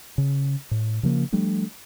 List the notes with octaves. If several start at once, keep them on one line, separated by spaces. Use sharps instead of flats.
C#3
A2
C#3 F3 A#3
F3 G3 A3 D4